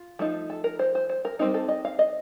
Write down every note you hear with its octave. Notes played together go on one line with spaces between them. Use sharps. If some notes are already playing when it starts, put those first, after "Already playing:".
Already playing: F4
F3 A3 D#4
A4
A#4
C5
C5
C5
A#4
G3 C4 D#4 A#4
A4
D#5
F5
D#5